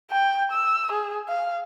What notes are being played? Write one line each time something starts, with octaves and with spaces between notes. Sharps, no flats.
G5
E6
G#4
F5